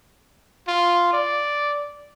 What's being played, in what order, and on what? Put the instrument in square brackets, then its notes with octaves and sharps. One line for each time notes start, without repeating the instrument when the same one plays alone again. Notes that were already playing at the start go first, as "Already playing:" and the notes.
[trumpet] F4
D5